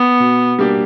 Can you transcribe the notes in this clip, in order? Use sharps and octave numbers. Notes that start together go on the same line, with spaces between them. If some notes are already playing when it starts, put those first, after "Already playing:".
Already playing: B3
B2
G3 A#3 D4 G4